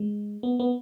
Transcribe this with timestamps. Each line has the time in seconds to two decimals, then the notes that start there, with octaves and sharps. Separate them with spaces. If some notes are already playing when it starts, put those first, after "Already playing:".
Already playing: G#3
0.43 B3
0.60 B3